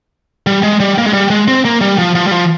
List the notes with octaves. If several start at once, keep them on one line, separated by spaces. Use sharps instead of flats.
G3
G#3
G3
A#3
G#3
G3
G#3
C4
A#3
G3
F3
F3
G3
F3